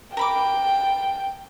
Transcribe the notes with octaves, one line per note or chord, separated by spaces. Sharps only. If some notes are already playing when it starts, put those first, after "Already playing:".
A#4 G5 B5 D6